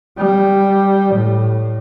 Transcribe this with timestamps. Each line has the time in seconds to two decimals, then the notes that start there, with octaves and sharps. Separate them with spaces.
0.18 G3
1.14 A2